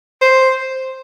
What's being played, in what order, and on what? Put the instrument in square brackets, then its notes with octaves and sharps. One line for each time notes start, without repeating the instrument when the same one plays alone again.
[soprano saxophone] C5